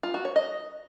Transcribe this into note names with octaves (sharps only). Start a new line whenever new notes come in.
F4
F#4
C#5
D#5